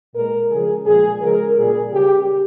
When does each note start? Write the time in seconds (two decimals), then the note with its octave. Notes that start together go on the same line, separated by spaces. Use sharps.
0.15 A#2 G#3 A#4
0.51 C#3 F3 G#3 G#4
0.85 A#2 F3 G#3 G#4
1.21 C#3 F3 G#3 A#4
1.58 A#2 G3 G#4
1.93 C#3 G3 G4